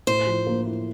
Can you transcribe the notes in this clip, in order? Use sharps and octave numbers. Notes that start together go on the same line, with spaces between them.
A2 C5
F3
A#3
E4